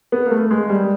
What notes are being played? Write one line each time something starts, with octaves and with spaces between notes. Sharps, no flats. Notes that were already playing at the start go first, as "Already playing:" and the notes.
B3
A#3
A3
G#3
G3